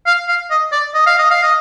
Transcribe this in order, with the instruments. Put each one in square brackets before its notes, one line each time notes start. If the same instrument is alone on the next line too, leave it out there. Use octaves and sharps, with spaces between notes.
[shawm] F5
F5
D#5
D5
D#5
F5
D#5
F5
D#5